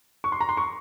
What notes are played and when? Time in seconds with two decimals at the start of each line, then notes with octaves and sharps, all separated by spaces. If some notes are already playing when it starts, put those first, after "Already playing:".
0.24 C#6
0.32 C6
0.41 A#5
0.49 C6
0.57 C#6